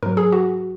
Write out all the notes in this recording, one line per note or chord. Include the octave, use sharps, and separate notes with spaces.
G#2 F#3 A#4
G#4
F#4